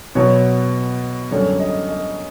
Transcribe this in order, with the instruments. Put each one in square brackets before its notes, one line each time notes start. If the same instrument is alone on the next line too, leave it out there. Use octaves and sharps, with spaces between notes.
[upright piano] B2 F#3 B3 C#5
F#2 D3 G3 C#5
D#5
D#5